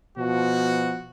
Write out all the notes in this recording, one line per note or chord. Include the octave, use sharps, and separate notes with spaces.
B2 F3 F#4